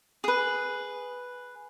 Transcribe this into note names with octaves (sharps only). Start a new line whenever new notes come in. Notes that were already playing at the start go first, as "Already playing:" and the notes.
G#4 B4